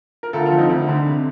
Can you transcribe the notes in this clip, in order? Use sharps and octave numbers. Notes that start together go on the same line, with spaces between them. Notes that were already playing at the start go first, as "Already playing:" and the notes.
A#4
D2 F4 A4
F4 A4
F3
C4 D#4
D2
D3
C3